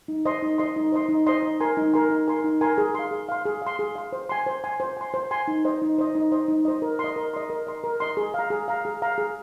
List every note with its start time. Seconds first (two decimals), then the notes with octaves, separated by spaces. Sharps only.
0.08 D#4
0.25 C5 D#5 C6
0.42 D#4
0.58 C5 D#5 C6
0.76 D#4
0.92 C5 D#5 C6
1.09 D#4
1.27 C5 D#5 C6
1.43 D#4
1.60 A#4 G#5 C6
1.77 D#4
1.93 A#4 G#5 C6
2.10 D#4
2.28 A#4 G#5 C6
2.44 D#4
2.61 A#4 G#5 C6
2.78 G#4
2.95 F5 C6
3.11 G#4
3.29 F5 C6
3.46 G#4
3.62 F5 C6
3.79 G#4
3.96 F5 C6
4.13 C5
4.29 G#5 C6
4.46 C5
4.64 G#5 C6
4.80 C5
4.97 G#5 C6
5.14 C5
5.31 G#5 C6
5.48 D#4
5.65 C5 D#5
5.82 D#4
5.98 C5 D#5
6.15 D#4
6.32 C5 D#5
6.48 D#4
6.65 C5 D#5
6.82 A#4
6.99 C6
7.04 D#5
7.16 A#4
7.34 D#5 C6
7.50 A#4
7.67 D#5 C6
7.84 A#4
8.00 D#5 C6
8.17 G#4
8.34 F5 A#5
8.50 G#4
8.68 F5 A#5
8.85 G#4
9.02 F5 A#5
9.18 G#4